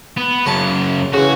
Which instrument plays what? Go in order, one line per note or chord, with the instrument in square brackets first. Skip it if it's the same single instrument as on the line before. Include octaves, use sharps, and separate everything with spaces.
[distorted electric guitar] B3
[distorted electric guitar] F#2 C#3 [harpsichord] C#5 A5
[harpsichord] C#3 E3 [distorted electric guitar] F#4